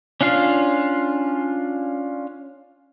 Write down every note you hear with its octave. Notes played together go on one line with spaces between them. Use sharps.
C#4 D4 F4 F5